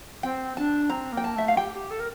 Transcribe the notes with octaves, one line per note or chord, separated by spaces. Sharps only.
C4 G5
D4 A5
C4 A#5
A#3
G5
A5
A3 E5
F5
G4 G5
G4
A4
A#4